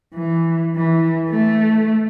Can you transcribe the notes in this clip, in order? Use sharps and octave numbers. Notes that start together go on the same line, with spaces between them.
E3
E3
A3